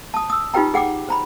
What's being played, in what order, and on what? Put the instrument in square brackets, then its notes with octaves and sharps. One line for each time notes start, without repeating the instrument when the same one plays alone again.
[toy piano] A5 D#6
D#6 E6
D#4 F4 G4 B4 G5 A#5
G#4 F#5 G5 D6
C5 A#5 B5